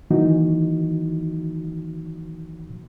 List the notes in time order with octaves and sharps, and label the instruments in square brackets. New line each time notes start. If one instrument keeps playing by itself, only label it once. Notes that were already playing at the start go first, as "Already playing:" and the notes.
[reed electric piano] D#3 E3 F#3 A#3 D#4 F#4